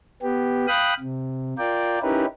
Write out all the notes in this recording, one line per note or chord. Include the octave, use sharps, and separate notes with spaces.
B3 G4
F5 G5 B5 D#6 F#6
C3
F4 A#4 D5 G5
C#4 D#4 E4 G4 A#4 B4